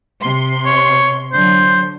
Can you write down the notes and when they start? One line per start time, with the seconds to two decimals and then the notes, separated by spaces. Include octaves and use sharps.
0.22 C3 C6
0.66 C#5
1.33 D3 F#3 C5